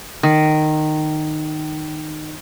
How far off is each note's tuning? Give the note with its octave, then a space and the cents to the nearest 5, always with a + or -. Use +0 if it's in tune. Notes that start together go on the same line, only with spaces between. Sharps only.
D#3 -15